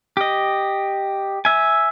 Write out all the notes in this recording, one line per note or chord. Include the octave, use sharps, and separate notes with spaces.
G4 D#5
E5 G#5